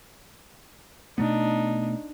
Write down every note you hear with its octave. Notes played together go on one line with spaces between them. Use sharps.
B2 A3 B3 D4 D#4